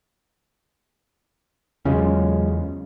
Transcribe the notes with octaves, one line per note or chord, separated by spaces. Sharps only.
E2 C#3 F#3 G#3 C#4 F4